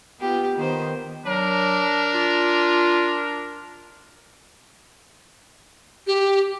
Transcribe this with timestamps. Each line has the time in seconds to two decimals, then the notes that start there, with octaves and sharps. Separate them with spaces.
0.19 B3 F4 G4
0.56 D#3 B3 C5
1.26 F#3 D4 A#4
2.14 F4
6.07 G4